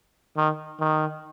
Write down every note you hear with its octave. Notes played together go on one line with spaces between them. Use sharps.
D#3
D#3